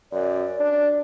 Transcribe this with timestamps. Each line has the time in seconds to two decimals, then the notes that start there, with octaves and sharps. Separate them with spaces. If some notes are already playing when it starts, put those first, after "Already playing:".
0.12 F#2 D5
0.60 D4